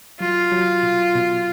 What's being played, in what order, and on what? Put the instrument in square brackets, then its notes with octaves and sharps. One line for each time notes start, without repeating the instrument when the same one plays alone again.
[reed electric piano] F#3 [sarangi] F4
[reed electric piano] F#3
B2
B2